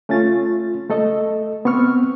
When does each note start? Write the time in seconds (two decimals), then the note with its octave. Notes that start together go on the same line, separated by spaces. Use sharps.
0.09 A3 C#4 F4 A6
0.90 A3 A4 D#5
1.65 B3 C4 C#6 F6